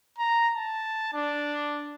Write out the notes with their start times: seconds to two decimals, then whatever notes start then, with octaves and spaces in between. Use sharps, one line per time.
0.18 A#5
0.56 A5
1.14 D4